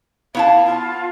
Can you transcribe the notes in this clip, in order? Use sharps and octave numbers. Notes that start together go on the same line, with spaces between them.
B3 E4 F5 A5
F4